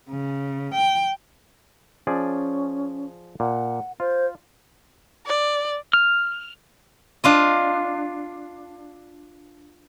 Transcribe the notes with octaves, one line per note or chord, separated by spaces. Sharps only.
C#3
G5
F3 C#4 G#4 D5
A#2 F#5
F4 C5
D5
F6
D4 F4 D#5